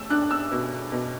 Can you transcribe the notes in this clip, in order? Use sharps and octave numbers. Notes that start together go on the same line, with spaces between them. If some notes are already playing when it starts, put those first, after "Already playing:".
Already playing: A3 E6
D4 F#6
E6
B2
B2